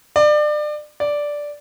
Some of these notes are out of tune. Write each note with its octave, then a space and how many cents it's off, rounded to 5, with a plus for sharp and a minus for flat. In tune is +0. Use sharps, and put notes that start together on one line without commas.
D5 +30
D5 -5